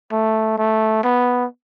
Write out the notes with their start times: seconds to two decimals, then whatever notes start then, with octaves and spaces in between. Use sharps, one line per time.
0.12 A3
0.58 A3
1.04 B3